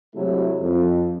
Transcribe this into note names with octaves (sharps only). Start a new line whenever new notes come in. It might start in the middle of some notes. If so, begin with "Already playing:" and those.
C3 F#3 G#3 A3 E4
F2